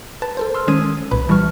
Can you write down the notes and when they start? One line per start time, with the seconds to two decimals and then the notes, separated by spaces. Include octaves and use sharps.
0.22 B4 A5 A6
0.37 A4 A#4 C5
0.54 C6 E6 F6
0.67 D#3 G#3 C#4 D#6 G#6 D#7
1.11 C2 A#2 B4 B5
1.29 E3 G3 A5 C#6 F6